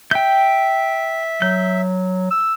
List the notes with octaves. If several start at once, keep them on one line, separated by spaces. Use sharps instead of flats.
E5 G5 G6
F#3 G6
E6